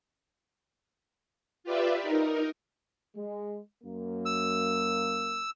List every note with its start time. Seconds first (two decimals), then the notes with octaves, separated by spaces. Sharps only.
1.64 F4 G4 B4 D5 E5
2.02 D#4 A#4
3.17 G#3
3.83 F#2 A#3
4.26 E6